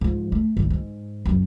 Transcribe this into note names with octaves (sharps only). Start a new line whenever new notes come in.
G#2 F3
A3
G#1 D2
G#2
F#1 F#3